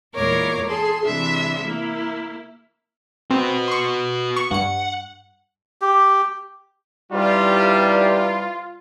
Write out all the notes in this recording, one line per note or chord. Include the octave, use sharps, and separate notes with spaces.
E2 A#2 G#3 A#4 C#5 D6
G#4 A4 C6
C3 E3 G#3 D4 E5
A#3 E4
C4 F#4 B4
C6 C#6
C#6
G2 F#5 C#7
G4
C3 E3 G3 D#4 F4 G4 D5